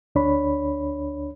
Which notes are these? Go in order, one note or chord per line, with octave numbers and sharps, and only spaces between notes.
D2 D4 C#5 B5